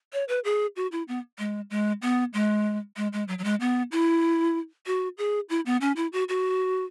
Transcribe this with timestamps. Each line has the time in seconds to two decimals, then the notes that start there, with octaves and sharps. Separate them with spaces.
0.13 C#5
0.28 B4
0.44 G#4
0.76 F#4
0.92 E4
1.08 B3
1.39 G#3
1.70 G#3
2.02 B3
2.34 G#3
2.97 G#3
3.13 G#3
3.28 F#3
3.38 F#3
3.44 G#3
3.60 B3
3.92 E4
4.86 F#4
5.18 G#4
5.49 E4
5.66 B3
5.81 C#4
5.96 E4
6.13 F#4
6.29 F#4